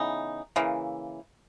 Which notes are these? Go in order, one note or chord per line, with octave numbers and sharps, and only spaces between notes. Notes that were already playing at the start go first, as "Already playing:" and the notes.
Already playing: C#3 E3 B3 D#4
C#3 E3 A#3